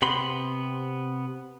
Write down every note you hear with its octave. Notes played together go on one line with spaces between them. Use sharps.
C3 B3 B5 C6